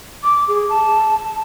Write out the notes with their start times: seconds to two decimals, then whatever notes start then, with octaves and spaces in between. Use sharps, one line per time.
0.24 D6
0.48 G#4
0.69 A5